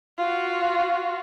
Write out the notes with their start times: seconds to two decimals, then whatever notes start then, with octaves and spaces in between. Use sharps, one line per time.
0.18 F4 F#4